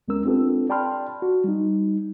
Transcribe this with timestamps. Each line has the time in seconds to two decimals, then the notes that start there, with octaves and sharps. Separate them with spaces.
0.08 D2 G#3 B3 C#4 A#4 E6
0.25 C4 D4 F4 G4 A4 B4
0.70 D5 G5 A5 B5 C6 F6
1.22 F#4
1.44 G3 D#4